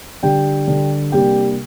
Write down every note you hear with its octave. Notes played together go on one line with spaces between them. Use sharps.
D3 G3 D4 G4 G5
D3 G3 D4
C3 G3 A#3 D4 G4 G5